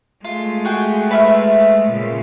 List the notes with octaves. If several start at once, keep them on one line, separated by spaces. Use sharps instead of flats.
G#3 A3 F4
F#4 G#4 G5
B4 E5 F6
A#2 C#3